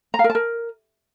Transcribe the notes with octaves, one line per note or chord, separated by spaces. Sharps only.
A#5
F5
A#4
A5
A#4